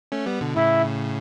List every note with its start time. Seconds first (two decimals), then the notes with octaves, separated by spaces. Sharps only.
0.12 A3 C#4
0.26 G3 B3
0.41 B2 D3
0.56 A2 C#3 E4